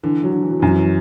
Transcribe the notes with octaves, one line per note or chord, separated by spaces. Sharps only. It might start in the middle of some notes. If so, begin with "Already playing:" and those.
D3 E3
F#3
D3
E3
F#3
F#2 E3
F#3
E3
F#3